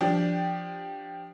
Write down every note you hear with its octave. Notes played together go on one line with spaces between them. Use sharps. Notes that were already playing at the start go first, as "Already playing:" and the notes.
F3 D4 G4